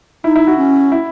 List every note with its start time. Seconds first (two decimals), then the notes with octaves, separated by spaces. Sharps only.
0.24 D#4 E4
0.36 E4
0.47 F#4
0.58 C#4
0.92 E4